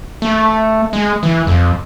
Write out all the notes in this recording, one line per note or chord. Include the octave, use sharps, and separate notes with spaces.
A3
G#3
E3
F2